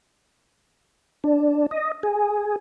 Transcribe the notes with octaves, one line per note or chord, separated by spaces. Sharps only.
D4
D#5
G#4